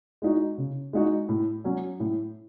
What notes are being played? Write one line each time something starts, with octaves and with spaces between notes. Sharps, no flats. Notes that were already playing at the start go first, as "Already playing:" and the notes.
G#3 D#4 F#4
C#3
G#3 D#4 F#4
A2
F#3 C#4
A2